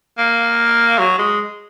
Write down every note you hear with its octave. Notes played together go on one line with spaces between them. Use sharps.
A#3
F#3
G#3